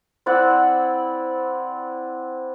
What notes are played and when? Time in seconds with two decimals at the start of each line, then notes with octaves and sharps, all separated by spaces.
0.26 C4 E4 D5 F#5